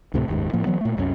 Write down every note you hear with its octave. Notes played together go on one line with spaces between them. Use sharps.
D2 A2 C3 A3
F#1 D#2 G#2
A2 F3 A#3
E3 F#3 B3
A#2 A3
C2 F#2 E3 C#4